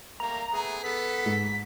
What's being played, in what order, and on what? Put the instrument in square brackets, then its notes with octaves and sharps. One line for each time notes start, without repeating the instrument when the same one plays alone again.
[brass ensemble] G3 A3 A#3 [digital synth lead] A#5
[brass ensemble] A3 B3 G#4
[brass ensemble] B3 A4 [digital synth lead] B6
[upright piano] G#2